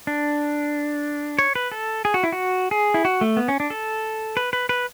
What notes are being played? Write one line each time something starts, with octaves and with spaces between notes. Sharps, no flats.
D4
C#5
B4
A4
G#4
F#4
E4
F#4
G#4
E4
F#4
A3
B3
C#4
D4
A4
B4
B4
B4